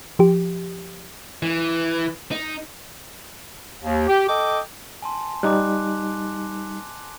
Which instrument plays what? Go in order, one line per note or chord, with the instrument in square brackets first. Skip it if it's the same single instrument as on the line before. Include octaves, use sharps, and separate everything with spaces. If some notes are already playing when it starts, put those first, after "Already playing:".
[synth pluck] F3 G4
[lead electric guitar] E3
D#4
[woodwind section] D#2
G4
A4 D#5 G5 D6
[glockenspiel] G#5 A5 C6
[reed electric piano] G3 D#4 [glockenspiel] D6 F#6